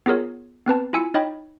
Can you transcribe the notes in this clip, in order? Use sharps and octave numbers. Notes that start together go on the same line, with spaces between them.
B3 F4 G#4 A#4 C#5
B3 C4 B4 A5
E4 F4 G#5 E6 C#7
D#4 C#5 D#5 G5 B5